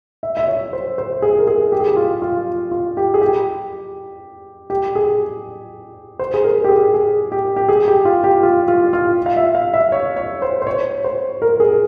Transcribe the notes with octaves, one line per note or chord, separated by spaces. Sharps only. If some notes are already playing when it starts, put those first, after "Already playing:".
E5
E5
C#5
C5
C5
G#4
A#4
G#4
G4
G#4
G4
F4
F4
F4
G4
G#4
G4
G4
G#4
C5
G#4
A#4
G4
G#4
G#4
G4
G4
G#4
G4
F4
G4
F4
F4
F4
F5
E5
F5
E5
C#5
C#5
C5
C5
C#5
C5
A#4
G#4